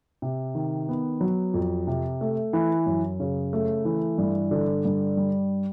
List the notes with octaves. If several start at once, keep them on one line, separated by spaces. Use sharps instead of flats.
C3
D#3
B3
F#3
F2
C3
A3
E3
F#2
C#3
A3
E3
G2
D3
G2
G3